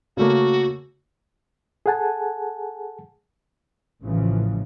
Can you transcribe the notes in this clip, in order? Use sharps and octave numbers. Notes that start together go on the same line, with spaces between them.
C#3 A3 A#3 F#4
G#4 A4 F#5 G#5 A5
A1 A2 C#3 E3 F3